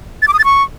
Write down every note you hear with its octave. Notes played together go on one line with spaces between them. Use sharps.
A6
D6
D#6
A6
C#6